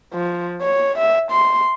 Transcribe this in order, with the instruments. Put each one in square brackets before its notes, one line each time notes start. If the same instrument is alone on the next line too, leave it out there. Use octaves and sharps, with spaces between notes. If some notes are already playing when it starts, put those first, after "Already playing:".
[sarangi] F3
C#5
E5
C6